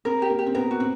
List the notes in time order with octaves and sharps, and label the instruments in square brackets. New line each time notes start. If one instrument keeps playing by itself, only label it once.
[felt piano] C4 [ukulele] A#4
[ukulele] G4
[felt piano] A#3
[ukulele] G4
[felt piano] C4
[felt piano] B3 [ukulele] A#4
[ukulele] F#4
[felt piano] C4